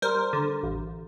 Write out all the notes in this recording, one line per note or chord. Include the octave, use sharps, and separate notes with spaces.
G3 A#4 C5
D3
A1